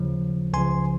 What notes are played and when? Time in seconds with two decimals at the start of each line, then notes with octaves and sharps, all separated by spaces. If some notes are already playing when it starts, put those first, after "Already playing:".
Already playing: D#2 C#3 F3
0.53 C#2 C#3 F3 G#5 C6